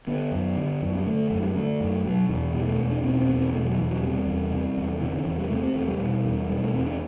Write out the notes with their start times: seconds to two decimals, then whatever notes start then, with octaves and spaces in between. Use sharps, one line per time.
0.07 D3 B3
0.32 F#2
0.56 D3
0.82 F#2
0.96 G3
1.06 D3 A3
1.31 F#2 A3
1.43 G3
1.55 D3 A3
1.80 F#2
2.05 B2 F#3
2.29 E2 E3
2.54 B2 G3
2.67 A3
2.80 E2
2.91 D4
3.04 B2 C4
3.20 C4
3.29 E2
3.37 C4
3.53 B2 A3
3.65 F#3
3.78 E2 E3
3.91 F#3
4.02 C3 G3
4.27 E2
4.51 C3
4.77 E2
5.01 C3 E3
5.14 D3
5.26 E2 E3
5.38 G3
5.50 C3 A3
5.63 C4
5.75 E2 A3
5.88 G3
6.00 B2
6.24 E2
6.49 B2 G3
6.61 A3
6.73 E2 C4
6.87 D4